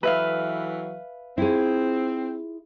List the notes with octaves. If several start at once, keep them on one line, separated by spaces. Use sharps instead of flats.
E3 F#3 A4 B4 E5 F5
C4 E4 F4 G#4